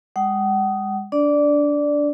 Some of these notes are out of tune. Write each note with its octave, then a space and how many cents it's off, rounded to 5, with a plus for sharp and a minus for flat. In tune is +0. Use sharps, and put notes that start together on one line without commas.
G#3 -35 F#5 +40 D#6 +0
D4 -20 D5 +0